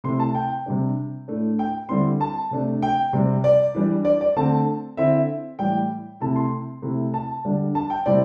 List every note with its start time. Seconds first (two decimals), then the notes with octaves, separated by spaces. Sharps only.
0.04 C3 A3 E4 C6
0.20 A5
0.35 G5
0.66 C3 G3 D4
1.28 A2 A3 D4
1.59 G5
1.89 D3 G3 C4 E4 C6
2.21 A5
2.51 C3 A3 D4
2.82 G5
3.13 C3 G3 C4
3.44 D5
3.75 E3 G3 D4
4.05 D5
4.21 D5
4.36 D3 A3 C4 A5
4.97 D3 C4 E4 E5
5.59 A2 E3 G3 G5
6.20 C3 A3 C4 E4 A5
6.36 C6
6.82 C3 A3 E4
7.14 A5
7.45 D3 G3 D4
7.75 A5
7.90 G5
8.06 C3 G3 C4 E4 D5